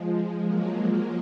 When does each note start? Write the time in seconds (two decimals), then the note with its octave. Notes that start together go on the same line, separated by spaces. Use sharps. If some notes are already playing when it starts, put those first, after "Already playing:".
Already playing: F3 G#3
0.14 F3 G#3
0.47 F#3 A#3
0.80 F3 G#3